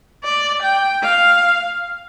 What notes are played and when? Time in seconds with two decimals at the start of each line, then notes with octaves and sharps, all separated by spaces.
0.24 D5
0.63 G5
1.03 F5